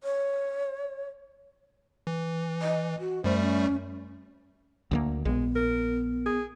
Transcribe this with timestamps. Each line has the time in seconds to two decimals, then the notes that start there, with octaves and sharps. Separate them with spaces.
0.03 C#5
2.07 E3
2.62 D#5
2.99 F#4
3.24 F#2 G3 A3 C5
3.40 C#4
4.91 D2 G3 A#3
5.25 A#1 G#3 B3
5.56 A#4
6.26 G#4